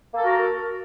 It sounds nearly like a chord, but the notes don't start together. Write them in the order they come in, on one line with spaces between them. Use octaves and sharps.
A#3 A4 A#4 F#4